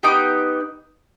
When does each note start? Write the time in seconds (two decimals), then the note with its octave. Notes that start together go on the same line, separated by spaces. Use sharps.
0.03 B3 D#4 G4 D6